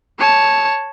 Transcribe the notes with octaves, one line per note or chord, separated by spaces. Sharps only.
C#5 A5